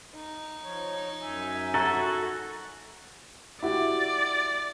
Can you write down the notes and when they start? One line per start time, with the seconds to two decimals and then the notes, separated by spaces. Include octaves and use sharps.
0.15 D#4
0.63 F3 C#5
1.22 F#2 E5 G#5
1.74 F#4 A4 A#5
3.63 E4 F#4 G4 D5